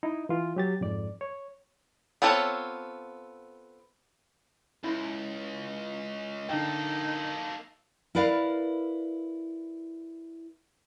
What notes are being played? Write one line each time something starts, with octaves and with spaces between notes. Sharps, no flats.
D#4 E4
E3 F4
F#3 G4 A6
F2 G#2 D5
C#5
B3 C4 F4 A4 C#5
C#2 E4
D3 A#3 D#4 A4 G5
E4 A#4 B4 D5 F5